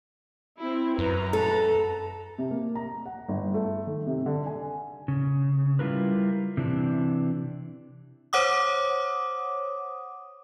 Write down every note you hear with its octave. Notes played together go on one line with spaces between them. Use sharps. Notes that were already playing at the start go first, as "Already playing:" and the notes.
C4 E4
F#2 B4 A#5
A4
C3
A#3
A#5
F#5
G1
A3
D#3
C3
D3
G#5
C#3
G3 E4 F4 A#4 B4
C3 E3 D4
C5 C#5 F#5 D6 D#6